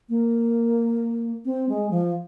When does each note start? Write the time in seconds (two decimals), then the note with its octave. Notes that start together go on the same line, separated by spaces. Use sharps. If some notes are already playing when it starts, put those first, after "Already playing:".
0.09 A#3
1.45 C4
1.69 G#3
1.91 F3